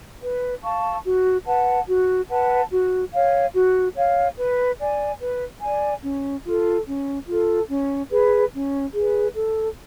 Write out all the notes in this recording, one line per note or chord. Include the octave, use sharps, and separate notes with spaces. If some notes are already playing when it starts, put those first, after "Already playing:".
B4
F5 A5 C#6
F#4
B4 F#5 A5
F#4
B4 F#5 A5
F#4
C#5 F5
F#4
C#5 F5
B4
D5 G#5
B4
D5 G#5
C#4
F4 A4
C#4
F4 A4
C#4
G#4 B4
C#4
G#4 B4
A4